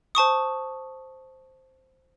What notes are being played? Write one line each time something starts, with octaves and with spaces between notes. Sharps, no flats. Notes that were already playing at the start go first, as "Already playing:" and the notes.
C5 A5 C#6 D#6